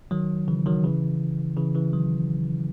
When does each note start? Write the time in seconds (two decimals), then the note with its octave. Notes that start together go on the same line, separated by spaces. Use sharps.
0.11 D#3 F#3
0.48 C#3 E3
0.66 D#3 F#3
0.84 C#3 E3
1.57 C#3 E3
1.75 C#3 E3
1.93 D#3 F#3